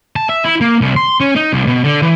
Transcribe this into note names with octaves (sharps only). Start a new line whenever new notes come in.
A5
E5
E4
A#3
C2
C6
C#4
D#4
C2
B2
D3
E3